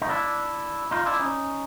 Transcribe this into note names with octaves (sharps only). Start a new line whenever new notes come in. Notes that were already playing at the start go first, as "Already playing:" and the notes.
D#4
D4 E4
D#4 F4
D4 E4
C#4 D#4